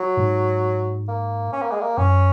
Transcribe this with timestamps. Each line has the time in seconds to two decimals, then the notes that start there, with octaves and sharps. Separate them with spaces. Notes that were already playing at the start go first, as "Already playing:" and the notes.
Already playing: F#3
0.17 G#2
1.08 A#3
1.53 C#4
1.62 A#3
1.71 G#3
1.81 A#3
1.98 F#2 C#4